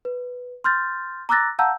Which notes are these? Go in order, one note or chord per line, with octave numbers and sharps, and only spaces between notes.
B4
C6 F6 G6 A6
A#5 D6 E6 F#6 A6 A#6
F5 F#5 A5 A#5 E6 G6